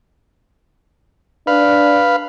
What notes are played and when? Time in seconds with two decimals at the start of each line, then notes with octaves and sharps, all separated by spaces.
1.47 D4 B4 F5